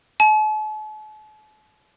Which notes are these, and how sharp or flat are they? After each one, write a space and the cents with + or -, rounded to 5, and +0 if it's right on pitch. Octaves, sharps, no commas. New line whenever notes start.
A5 -45